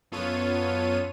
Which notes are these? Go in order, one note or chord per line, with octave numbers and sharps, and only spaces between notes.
F#2 B3 F4 A4 C#5 D#7